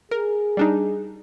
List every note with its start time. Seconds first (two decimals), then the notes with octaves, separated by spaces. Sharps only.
0.11 G#4 A#4
0.57 G3 D4 D#4